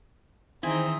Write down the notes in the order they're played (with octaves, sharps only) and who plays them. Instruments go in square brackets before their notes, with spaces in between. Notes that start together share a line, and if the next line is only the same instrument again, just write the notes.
[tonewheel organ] D#3 E3 [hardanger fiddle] C4 D#4 [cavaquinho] E4 G#4